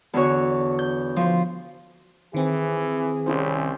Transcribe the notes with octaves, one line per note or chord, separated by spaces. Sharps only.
E2 D3 F#4 C#5
G6
F3 C5
D#3 E3 C4 G#4
C2 C#4 E4 C5